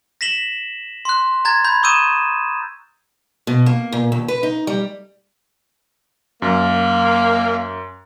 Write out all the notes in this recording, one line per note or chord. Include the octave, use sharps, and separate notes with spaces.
A#6 B6 E7 F#7 G7
C6 F#6
A#5 F#6 G#6 A6
B5 G6 G#6
C#6 D#6 E6 G6 D#7 E7
B2
A#3
A#2
D#2
B4
D#4
G3
F#2 A#3